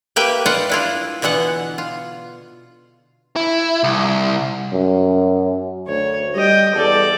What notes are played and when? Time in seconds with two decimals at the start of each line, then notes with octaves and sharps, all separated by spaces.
0.16 A#3 G4 B4 E5 G5
0.46 F4 B4 D5 D#5 F#5
0.70 D4 E4 F4
1.22 B2 D3 E3 B3 F#5
1.78 F4
3.36 E4
3.84 C2
4.73 F#2
5.88 D2 C#5
6.35 G3 D#5 G5
6.75 E2 A4 D5